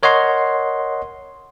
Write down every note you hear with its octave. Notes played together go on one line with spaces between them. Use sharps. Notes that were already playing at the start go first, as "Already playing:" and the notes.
A#4 C#5 D#5 F#5 C6